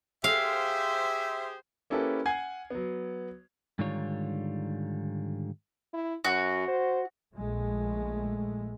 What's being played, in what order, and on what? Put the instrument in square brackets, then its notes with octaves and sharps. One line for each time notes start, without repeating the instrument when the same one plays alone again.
[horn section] G4 G#4 C5 [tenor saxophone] E5 [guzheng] F5
[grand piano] A#3 C#4 E4 G4 A4 B4
F#5 G#5 G#6 C7
F#3 B3
[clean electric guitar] G#2 D3 D#3 G3 F4 C#5
[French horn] E4
[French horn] F#2 [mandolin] F#4
[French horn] C5
[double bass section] A#1 G#3 A3